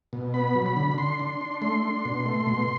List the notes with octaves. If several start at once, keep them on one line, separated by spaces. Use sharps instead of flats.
B2
B3 B5
F#3
B5
D3
D3 C6
D4
D4
A3 C6
D4
B2
A3
B2